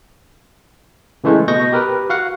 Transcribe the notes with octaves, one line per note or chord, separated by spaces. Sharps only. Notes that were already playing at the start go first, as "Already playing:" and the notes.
C#3 E3 G#3 A3
B2 D#5 C#6 G6 A#6
G4 A#4 B4
F#4 F5 F#5